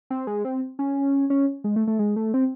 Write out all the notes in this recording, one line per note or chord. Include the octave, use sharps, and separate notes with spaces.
C4
G#3
C4
C#4
C#4
G#3
A3
A3
G#3
A3
C4